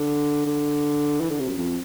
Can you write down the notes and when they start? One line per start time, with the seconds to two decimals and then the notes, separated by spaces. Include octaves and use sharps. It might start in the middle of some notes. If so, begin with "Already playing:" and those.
Already playing: D3
0.46 D3
1.20 E3
1.30 D3
1.40 C3
1.48 F#2
1.58 F2